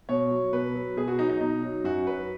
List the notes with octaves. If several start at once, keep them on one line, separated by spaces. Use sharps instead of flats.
B2 C#5
F#3
B2 B4
F#3
B2 G#4
F#4
F#3 D#4
D#4
B2 D#4
F#3
F#2 F#4
F#3 B4